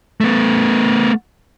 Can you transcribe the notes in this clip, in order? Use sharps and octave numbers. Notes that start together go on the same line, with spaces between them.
A3 B3